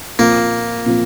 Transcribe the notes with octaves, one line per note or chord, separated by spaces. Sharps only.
A#2 F3 A#3 C4
A#2 F3 C4